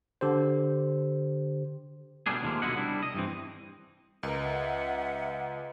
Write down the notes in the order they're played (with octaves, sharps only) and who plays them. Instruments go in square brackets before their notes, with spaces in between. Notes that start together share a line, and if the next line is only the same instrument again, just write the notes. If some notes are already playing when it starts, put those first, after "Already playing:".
[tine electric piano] D3 G4 C5
[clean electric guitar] B2 F#3 G3 A3 D4 G#4
D#2 C3 F3 F#3 G#3 A#3
B2 D3 F#3 E4 D#5 F#5
C2 G3 D4 E4
D#5
G2 E3 C4
[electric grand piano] C#2 [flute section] A#4 [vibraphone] B4 D#5
[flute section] E5 F#5